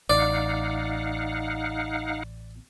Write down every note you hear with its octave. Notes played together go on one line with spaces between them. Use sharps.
A1 D#4 D5 F5 F#5